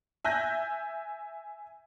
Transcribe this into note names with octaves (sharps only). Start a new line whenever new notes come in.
E5 G#5 F#6 G6 A#6